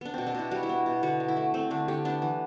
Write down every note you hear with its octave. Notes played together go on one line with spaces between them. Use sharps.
B3 D4
B2 C4
D4
B2 E4
G3 F#4
E4
B3
B2
D3 F#4
D3
E4
A3
A3 C4
D3 D4
D3 G4
B3 D4
E3